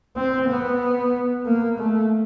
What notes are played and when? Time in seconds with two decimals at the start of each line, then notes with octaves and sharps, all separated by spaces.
0.16 C4
0.48 B3
1.45 A#3
1.78 A3